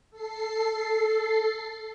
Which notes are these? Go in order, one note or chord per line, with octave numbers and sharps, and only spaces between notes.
A4 C7